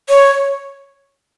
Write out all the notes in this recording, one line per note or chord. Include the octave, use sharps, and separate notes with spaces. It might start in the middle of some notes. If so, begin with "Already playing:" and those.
C#5